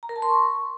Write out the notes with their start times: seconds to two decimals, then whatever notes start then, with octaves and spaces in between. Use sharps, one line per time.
0.03 A#5
0.09 A#4
0.16 A5
0.22 C6
0.29 C#6